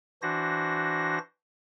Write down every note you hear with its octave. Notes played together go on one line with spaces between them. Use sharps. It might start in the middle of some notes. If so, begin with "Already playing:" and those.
E3 D4 F#4 C5 A#6